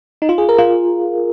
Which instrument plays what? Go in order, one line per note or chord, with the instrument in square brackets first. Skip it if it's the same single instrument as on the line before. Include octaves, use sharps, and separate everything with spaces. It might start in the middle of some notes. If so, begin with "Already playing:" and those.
[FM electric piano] D#4
F4
G#4
A#4
F4